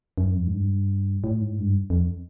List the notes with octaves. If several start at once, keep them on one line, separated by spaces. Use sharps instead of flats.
F#2
F2
G#2
G2
A2
G#2
G2
F2